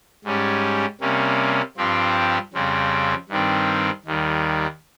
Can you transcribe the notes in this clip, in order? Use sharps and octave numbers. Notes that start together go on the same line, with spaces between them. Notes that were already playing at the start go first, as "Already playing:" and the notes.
G#2 G3 C#4 G4
C3 G3 A#3 C#4
G2 F3 C4 G4
F2 C#3 G3 C4
G2 D#3 G3 C4
D#2 D#3 G3